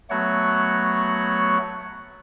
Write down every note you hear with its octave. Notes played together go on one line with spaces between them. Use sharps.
F#3 A3 B3 F#4 C#5 F#5